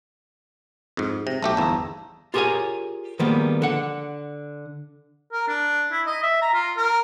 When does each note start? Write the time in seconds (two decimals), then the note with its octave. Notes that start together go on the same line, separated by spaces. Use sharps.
0.97 F2 G#2
1.27 C3 A#6
1.42 B1 A3 G4 A5
1.57 G1 E2 A#5 E6
2.34 F4 G4 G#4 A#4 C#5 G#5
3.19 D#3 F3 G3 G#3 A#3 B3
3.62 D3 F#5
5.32 A#4
5.48 D4
5.92 E4
6.06 D#5
6.23 E5
6.42 A#5
6.54 F4
6.77 A#4